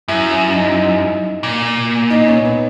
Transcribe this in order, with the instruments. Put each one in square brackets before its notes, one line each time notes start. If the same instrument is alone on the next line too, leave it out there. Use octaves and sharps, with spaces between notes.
[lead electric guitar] F#2 [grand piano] E4
[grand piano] E4
D#4
D#4
[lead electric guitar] A#2
[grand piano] D#4
C#4
B3